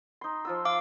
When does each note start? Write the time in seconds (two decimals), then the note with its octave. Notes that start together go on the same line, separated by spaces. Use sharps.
0.21 D#4 C6
0.45 F3 F4 E6
0.65 F5 D6